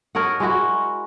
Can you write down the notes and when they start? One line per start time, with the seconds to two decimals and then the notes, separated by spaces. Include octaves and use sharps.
0.15 A#4 C#5 D#5 F#5
0.40 G#3 E4 F#4